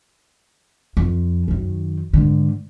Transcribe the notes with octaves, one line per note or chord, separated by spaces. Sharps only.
F2
F#2 D#3
G#2 D3